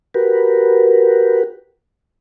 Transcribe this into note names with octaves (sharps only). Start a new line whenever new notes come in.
F#4 G4 A#4 B4